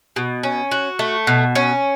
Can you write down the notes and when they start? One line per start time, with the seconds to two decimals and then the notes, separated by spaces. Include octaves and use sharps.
0.16 B2
0.43 C#4
0.71 F#4
0.99 A3
1.27 B2
1.55 C#4